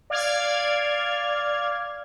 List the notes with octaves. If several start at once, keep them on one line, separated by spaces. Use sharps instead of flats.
D5 F5 F6 G#6